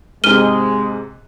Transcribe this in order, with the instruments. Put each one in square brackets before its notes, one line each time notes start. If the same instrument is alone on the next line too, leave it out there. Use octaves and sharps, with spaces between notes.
[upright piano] G#2 C3 [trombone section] G#3 [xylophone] F6 D#7 G7